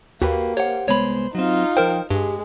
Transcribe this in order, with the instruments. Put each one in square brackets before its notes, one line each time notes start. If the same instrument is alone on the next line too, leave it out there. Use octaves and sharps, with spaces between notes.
[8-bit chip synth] D#2 [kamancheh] A#3 [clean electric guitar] F#4 G4 B4
[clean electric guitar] G4 C5 F#5 [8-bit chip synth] C#5
[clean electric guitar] C2 G#3 B3 [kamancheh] C5 [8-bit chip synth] C#5 B5
[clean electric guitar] F#3 C4 [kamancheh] D#4 F4
[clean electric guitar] F3 G5 [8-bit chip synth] A#4 C5
[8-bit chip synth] G2 [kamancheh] G#3 [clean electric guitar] G4